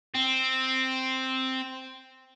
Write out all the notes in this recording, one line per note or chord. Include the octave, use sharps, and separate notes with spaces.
C4